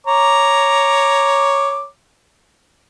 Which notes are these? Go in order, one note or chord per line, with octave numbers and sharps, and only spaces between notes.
C#5 A#5 D6